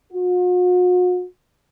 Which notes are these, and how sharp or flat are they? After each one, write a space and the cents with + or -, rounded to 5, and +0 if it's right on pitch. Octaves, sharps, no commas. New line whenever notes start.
F#4 -45